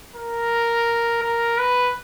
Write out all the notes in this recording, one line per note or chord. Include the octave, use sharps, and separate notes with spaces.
A#4
A#4
B4